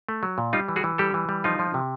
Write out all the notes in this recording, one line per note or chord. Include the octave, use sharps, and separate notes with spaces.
A3
F#3
A#2
G3 D#4 F4
E3
F#4 G#4
E3
G3 G4 A4
E3
G3
F3 D#4 F4
F3
C3